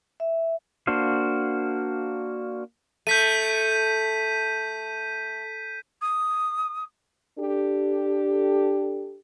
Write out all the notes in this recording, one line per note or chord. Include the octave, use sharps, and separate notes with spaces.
E5
A#3 D4 F#4 C5 F5
A3 G6 B6 D#7
D#6
D4 G4 A4